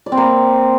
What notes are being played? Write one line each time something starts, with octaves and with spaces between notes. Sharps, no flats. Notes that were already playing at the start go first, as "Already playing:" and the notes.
D5
C4
A#3